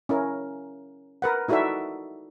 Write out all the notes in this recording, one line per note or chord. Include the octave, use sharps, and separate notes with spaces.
C#4 E4 A#4
A#4 B4 F#5
D#4 E4 F#4 A4 D5 E5